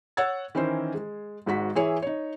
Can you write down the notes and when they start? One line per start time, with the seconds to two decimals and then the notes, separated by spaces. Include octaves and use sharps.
0.17 C#5 F#5 E6 G#6 A6
0.55 D#3 E3 C#4 E4 A#4 C5
0.94 G#3
1.46 G#1 G#2 F#4 B6
1.75 E3 E4 G#4 C#5
2.02 D#4 C#5